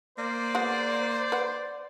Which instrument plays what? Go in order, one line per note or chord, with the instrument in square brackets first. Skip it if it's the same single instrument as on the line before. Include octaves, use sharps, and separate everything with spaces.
[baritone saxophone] A#3 [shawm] C5 [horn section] D5
[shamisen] G#3 B3 F#4
B4 F#5